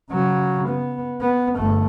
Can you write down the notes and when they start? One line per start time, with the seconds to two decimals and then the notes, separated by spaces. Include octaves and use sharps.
0.10 C#3 F#3
0.69 B3
1.22 B3
1.56 G1 A3